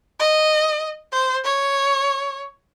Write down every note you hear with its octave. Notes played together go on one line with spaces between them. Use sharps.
D#5
C5
C#5